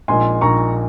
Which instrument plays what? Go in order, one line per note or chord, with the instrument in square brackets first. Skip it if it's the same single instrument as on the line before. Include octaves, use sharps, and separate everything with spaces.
[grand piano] A#1 A#2 G#3 D#4 [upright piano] G#5 C6
[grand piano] A#1 A#2 G#3 D#4 [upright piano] A#5 C#6